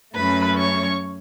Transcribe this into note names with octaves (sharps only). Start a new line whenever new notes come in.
F#2 F#3 A3 C#4 B4 B5
C#5 C#6